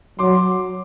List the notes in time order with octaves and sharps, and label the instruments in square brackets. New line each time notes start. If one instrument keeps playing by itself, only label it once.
[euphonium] F#3 [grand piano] C6 D6